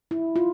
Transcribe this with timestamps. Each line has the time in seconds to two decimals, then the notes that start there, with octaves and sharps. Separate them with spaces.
0.11 E4
0.36 F4